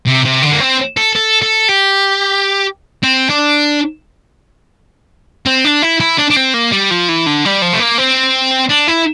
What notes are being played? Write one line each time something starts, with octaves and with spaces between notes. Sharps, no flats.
C3
C3
D3
A#3
C4
A4
A4
A4
G4
C4
D4
C4
D4
E4
E4
D4
D4
C4
A#3
G3
F3
E3
D3
G3
F3
A3
A#3
C4
D4
E4